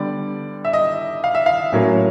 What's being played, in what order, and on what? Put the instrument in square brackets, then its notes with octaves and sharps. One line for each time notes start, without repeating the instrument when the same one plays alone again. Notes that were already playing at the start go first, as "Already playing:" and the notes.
Already playing: [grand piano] D3 G3 B3 D5
E5
D#5
F5
E5
F5
A2 F#3 A#3 C#4